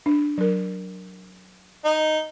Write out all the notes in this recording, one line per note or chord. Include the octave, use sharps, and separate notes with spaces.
D4
F#3 A#4
D#4